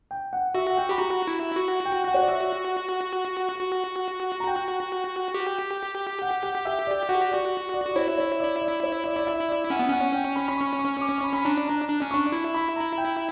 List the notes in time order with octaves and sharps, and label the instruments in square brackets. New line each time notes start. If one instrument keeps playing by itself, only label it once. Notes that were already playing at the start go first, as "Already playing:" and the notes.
[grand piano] G5
F#5
[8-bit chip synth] F#4 [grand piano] E5
[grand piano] F#5
G5
[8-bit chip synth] G4 [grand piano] B5
[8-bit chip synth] F#4 [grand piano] A#5
[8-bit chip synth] E4
F#4
[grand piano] G5
F#5
C#5
D5
E5
[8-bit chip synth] F#4
[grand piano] A#5
G5
[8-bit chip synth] G4
[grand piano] F#5
F#5
E5
D5
[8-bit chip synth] F#4 [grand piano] F#5
[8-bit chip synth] G4
[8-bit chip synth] F#4 [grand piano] D5
[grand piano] D5
[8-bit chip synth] F#4
[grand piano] D5
[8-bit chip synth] E4 [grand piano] C#5
[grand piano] C#5
D5
D5
C#5
D5
D5
E5
D5
[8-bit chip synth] C#4 [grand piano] F#5
[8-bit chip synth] B3
[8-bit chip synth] C#4 [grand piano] F#5
[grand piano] G5
B5
B5
C#6
C#6
C#6
D6
C#6
B5
B5
[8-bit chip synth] D4 [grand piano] A#5
[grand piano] A#5
[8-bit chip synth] D4
C#4
[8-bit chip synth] D4 [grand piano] C#6
[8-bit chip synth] E4
[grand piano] B5
A#5
G5